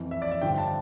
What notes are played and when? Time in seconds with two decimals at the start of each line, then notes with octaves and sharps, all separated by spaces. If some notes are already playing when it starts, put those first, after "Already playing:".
Already playing: F2 E3
0.11 E5
0.22 D5
0.32 E5
0.42 G2 D3 F3 G5
0.58 A5